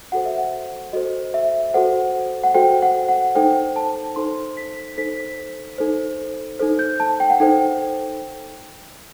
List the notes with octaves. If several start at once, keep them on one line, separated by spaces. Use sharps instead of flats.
F#4 A4 C5 F#5
E5
F#5
F#4 A4 C5 D#5
E5
F#4 A4 C5 F#5
F#5
F#4 A4 C5 G5
F#5
F#5
D#4 A4 C5 G5
A5
D#4 A4 C5 C6
B6
D#4 A4 C5 B6
D#4 A4 C5
D#4 A4 C5
G6
A5
G5
F#5
D#4 A4 C5 G5